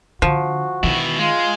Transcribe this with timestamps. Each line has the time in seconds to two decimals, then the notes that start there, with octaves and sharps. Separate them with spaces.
0.22 D3 F3 F#4
0.83 B2 D#3 E4
1.19 G#3 F4